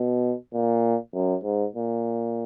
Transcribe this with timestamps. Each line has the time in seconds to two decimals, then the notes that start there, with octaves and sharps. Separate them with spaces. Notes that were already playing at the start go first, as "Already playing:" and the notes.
Already playing: B2
0.54 A#2
1.14 F#2
1.44 G#2
1.75 A#2